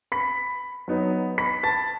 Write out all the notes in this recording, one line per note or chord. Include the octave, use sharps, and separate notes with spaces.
B5 B6
F#3 B3 D#4
B5 B6
A5 A6